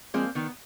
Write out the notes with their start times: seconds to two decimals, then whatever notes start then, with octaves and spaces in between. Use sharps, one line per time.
0.14 F3 G#3 A#3 C4
0.35 D#3 B3